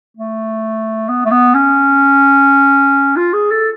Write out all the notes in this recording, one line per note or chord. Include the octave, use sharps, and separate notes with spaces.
A3
B3
A3
B3
C#4
F4
G#4
A4